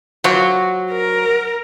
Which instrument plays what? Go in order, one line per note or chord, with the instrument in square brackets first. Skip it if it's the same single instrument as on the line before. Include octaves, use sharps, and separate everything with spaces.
[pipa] F3 A#3 F#4 [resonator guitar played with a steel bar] F#3
[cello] A#4